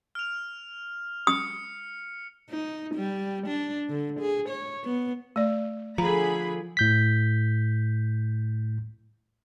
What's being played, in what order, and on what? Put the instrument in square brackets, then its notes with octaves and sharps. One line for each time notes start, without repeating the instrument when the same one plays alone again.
[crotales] F6 F7
[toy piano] D#6 [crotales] C#7
[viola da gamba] D#4
G3
D4
D3
G#4
C#5
B3
[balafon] A3 D5
[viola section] D3 G#4 B5 [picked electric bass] F3 [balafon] A#5
[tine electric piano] A2 G6 B6